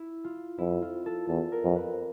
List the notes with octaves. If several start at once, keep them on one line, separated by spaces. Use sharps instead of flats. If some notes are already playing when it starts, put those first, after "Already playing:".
Already playing: E4
F4
F2 E4
F4
A4
E2 A4
A#4
F2
B4